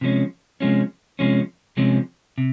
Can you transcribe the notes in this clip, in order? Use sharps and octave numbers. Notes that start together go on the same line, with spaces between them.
C3 F3 G#3 C#4
C3 F3 G#3 C#4
C3 F3 G#3 C#4
C3 F3 G#3 C#4
C3